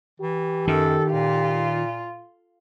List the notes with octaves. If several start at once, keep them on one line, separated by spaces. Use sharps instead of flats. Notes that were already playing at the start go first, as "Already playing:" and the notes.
E3 G4
F#2 D#3 A4
A#2 F4